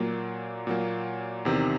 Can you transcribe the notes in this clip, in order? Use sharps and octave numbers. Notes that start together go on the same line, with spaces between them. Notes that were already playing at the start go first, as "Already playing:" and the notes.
Already playing: A#2 F#3 A#3
A#2 F#3 A#3
E2 C3 D#3